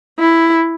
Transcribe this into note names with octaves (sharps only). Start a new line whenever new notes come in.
E4